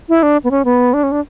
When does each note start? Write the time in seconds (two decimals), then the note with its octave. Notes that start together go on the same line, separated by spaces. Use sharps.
0.09 E4
0.23 D4
0.44 B3
0.51 C#4
0.65 B3
0.94 D4
1.03 C#4
1.12 D4